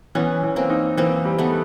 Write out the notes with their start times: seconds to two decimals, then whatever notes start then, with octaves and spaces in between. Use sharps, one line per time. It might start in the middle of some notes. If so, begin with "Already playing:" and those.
0.15 E3 B3 C#4
0.43 E3
0.56 A#3 C4
0.70 D#4
0.97 E3 A#3 C4
1.25 G3
1.38 A3 B3